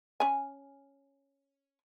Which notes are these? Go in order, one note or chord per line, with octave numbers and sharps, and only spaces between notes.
C#4 G#5